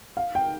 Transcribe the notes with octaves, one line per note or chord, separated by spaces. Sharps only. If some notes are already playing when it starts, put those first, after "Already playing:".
F5
G5